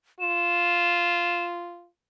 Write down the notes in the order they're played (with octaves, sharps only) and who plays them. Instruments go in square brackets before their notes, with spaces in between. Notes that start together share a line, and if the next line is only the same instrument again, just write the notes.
[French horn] F4 [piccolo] E7